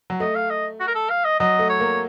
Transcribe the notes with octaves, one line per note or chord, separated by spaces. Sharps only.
F#3
A3 D#5
F5
D#5
F#4
A#4
A4
F5
D#5
F#3 D#5
A3
C#5
A#3